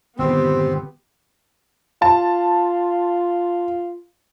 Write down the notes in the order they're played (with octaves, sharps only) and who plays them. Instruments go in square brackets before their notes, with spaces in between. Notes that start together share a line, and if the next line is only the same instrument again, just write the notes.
[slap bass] G1 A#2 D#3 [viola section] B3 G4 [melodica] C4
[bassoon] F4 [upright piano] A5